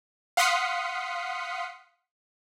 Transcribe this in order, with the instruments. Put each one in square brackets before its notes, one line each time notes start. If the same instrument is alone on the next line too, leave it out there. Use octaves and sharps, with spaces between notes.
[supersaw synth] F5 F#5 C6 D#6 B6 C#7